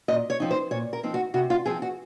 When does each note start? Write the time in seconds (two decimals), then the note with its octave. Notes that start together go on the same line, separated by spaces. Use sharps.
0.08 A#2 D#5
0.30 C#5
0.40 F3 C4 D#4
0.51 C5
0.71 A#2 C#5
0.93 A#4
1.03 F3 C4 D#4
1.14 F#4
1.34 C3 F#4
1.50 F4
1.66 F3 C4 D#4 G#4
1.82 F#4